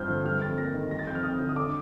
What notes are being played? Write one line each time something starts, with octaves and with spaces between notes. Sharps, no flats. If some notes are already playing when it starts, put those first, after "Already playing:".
Already playing: G2 F3 C4 F6 G6
D3
G3 F6
F2 A6
A#3 A#6
D#3
G3 A#6
A6
F2 G6
F6
F2 D#6
D3
D#6
D4 D6